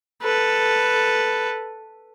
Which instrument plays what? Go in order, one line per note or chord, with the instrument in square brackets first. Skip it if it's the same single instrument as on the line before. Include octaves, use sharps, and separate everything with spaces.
[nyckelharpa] A4 B4